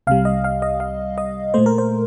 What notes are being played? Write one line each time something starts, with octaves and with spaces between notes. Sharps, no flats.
C2 C3 G3 F5
D#5
F5
D#5
F5
D#5
A#2 A3 C5
A#4
C5